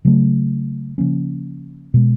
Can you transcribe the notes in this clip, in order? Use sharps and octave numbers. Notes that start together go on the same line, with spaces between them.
C#3 F#3 A3
C#3 F3 A#3 C#4
B2 G#3